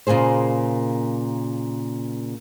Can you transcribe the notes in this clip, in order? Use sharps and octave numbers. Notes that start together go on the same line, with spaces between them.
A#2 C#3 A#3 G#4 C5